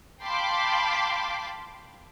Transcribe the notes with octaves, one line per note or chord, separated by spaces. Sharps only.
F5 G5 A5 B5 C6 D6